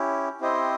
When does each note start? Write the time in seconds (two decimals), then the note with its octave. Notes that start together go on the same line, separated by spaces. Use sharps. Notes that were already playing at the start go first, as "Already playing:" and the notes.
Already playing: C#4 E4 G4
0.41 C4 E4 G4 C5 D#5